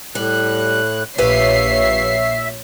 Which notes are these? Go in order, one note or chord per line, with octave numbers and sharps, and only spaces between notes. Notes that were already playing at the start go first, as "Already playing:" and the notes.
A2 G3 F#6
A#1 G4 B4 C#5 E5 F5 C7